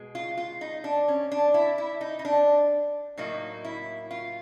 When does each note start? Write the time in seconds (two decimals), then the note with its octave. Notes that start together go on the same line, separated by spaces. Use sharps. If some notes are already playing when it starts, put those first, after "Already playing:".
Already playing: B2 G#3
0.15 F4
0.37 F4
0.61 D#4
0.84 D4
1.08 C#4
1.32 D4
1.54 E4
1.78 E4
2.01 D#4
2.19 D#4
2.25 D4
3.18 A2 F#3 A#3 D#4
3.65 E4
4.11 F4